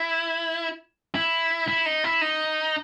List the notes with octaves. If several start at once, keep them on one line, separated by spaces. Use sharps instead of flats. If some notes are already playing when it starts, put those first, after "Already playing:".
Already playing: E4
E4
E4
D#4
E4
D#4